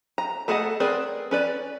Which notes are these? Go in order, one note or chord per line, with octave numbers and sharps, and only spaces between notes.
A#5
A3 G#4 A4 D#5 F#5
C4 G#4 A#4 B4 D5
C#4 B4 D5